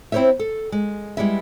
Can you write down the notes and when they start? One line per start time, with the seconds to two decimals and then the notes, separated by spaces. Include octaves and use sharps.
0.12 C4 E4 G4 C5 C#5 E5
0.39 A4
0.72 G#3
1.17 G3 G#3 B3 E4 E5